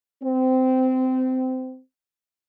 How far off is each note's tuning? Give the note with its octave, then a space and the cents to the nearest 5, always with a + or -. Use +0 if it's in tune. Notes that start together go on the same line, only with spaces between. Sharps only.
C4 -20